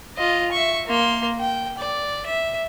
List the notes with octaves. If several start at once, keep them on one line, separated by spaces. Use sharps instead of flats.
F4 D#5
E5 C#6
A#3 C6
G5
D5
E5